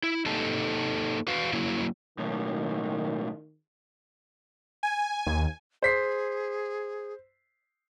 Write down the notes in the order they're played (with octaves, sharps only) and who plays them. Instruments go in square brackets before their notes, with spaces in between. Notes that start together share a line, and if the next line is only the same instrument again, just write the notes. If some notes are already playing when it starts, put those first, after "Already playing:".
[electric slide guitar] E4
A#3 D#4 G4 A4 D#5 A5
F#4 B4 F5
F#3 A#3 E4
[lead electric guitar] B1 A2 [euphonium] D#3
[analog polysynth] G#5
[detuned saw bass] D#2
[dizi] G#4 [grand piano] C5 B6 C7